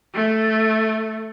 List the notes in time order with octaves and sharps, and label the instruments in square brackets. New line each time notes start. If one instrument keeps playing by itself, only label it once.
[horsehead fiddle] A3